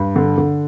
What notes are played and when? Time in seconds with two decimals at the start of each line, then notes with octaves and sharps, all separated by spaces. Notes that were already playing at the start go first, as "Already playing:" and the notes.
Already playing: G2
0.16 D3
0.38 D3